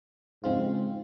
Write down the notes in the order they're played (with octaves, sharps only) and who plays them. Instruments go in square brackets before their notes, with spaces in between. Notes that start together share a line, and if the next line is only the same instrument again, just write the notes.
[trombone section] F2 G#2 [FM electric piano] C#3 G#3 C4 F4